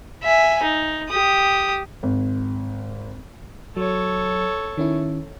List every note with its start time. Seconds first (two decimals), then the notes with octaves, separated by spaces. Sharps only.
0.23 E5 G#5
0.63 D#4
1.09 G4 D#6
2.03 G#1
3.77 F#3 A4 C#5
4.77 D#3 C#4 E4